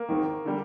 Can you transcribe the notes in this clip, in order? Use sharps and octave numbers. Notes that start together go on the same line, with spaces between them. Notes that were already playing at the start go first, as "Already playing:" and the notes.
Already playing: A#3
G#1 G#2 D#3
D3 G3